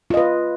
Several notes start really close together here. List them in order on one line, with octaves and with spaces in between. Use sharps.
F4 D#5 B4